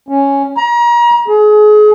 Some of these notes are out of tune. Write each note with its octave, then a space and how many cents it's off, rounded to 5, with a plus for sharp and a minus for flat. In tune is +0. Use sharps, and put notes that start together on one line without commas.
C#4 +0
A#5 +35
G#4 +30